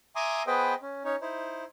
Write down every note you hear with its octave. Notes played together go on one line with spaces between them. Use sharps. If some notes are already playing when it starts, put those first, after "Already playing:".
E5 G#5 A#5 C6 D6 D#6
B3 G#4 B4 C5 D#5 G5
C#4
C#4 D#4 C#5
D#4 E4 C5